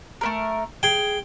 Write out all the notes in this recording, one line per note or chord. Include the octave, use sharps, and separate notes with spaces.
A3 B3 A#4
G#4 G5